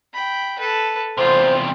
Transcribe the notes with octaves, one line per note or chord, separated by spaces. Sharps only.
G5 B5
A4 B4
E2 C3 F4 C5